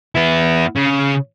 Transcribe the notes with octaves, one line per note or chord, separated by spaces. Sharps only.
B3 E4
C#3